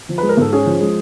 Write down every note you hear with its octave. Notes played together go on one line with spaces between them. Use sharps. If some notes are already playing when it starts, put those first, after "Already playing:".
F3
G#3 B4
A#4
G#2 A4
C#4 G#4
F3
G#3